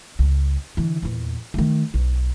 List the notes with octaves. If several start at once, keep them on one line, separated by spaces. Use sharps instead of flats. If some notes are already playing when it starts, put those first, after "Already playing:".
C#2
D3 E3
E2 A#2
D#3 A3
B1